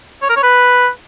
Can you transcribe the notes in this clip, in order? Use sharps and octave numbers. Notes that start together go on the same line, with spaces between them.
C#5
A#4
C#5
B4